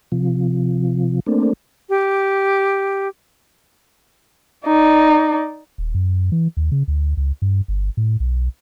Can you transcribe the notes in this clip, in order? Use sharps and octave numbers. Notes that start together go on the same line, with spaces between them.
C3 F3
A3 A#3 C4 D4
G4
D#4 D5
D#1
F#2
E3
D#2
C#3
D2
C#2
G2
G1
A2
B1